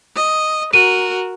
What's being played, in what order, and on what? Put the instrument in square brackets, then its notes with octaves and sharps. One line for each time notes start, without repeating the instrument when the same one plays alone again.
[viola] D#5
[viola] F#4 A#4 [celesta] D#7